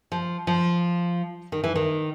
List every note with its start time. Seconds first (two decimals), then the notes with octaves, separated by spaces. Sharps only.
0.12 F3
0.47 F3
1.52 D#3
1.64 E3
1.75 D#3